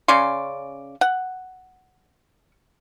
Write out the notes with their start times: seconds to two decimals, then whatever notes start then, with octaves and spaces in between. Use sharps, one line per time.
0.08 C#3 C#4 D5 C6
1.01 F#5